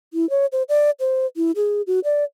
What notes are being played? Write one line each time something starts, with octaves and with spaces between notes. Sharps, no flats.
E4
C#5
C5
D5
C5
E4
G#4
F#4
D5